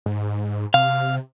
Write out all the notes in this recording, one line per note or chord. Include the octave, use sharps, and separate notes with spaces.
G#2
C3 F5